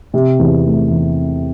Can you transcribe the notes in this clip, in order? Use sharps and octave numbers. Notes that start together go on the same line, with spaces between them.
C3
E2
A3
E2